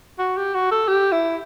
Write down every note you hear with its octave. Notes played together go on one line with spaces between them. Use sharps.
F#4
G4
F#4
A4
G4
E4